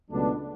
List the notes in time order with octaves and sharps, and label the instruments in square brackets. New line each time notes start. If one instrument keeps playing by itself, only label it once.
[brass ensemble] C#2 B2 F#3 A3 B3 D4